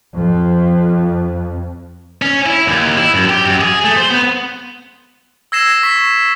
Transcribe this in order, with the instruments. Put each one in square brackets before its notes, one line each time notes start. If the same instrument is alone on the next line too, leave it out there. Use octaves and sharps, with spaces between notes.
[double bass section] F2
[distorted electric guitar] C#4
E4
D#2
E4
F#2
G4
F#2
G#4
A3
C5
B3
[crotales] E6 G#6 A#6 C7 E7
C#6 B6